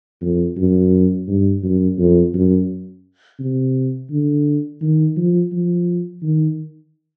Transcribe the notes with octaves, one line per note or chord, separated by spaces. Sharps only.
F2
F#2
G2
F#2
F2
F#2
C3
D3
D#3
F3
F3
D#3